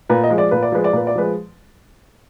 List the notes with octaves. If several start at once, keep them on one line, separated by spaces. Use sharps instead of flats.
A#2 B4
D#5
F3 G#3
D5
A#2 B4
D5
F3 G#3 B4
D5
A#2 B4
D5
F3 G#3 B4